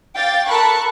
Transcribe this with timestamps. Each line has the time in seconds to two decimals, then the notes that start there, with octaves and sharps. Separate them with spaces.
0.16 F5 G5 D6 A6
0.49 A4 A#4 A5 B5 C#6 F#6